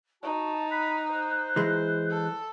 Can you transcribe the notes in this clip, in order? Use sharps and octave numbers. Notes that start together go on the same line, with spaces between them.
D#4 F#4 A5
B5 F#6
C5
E3 G#3
A4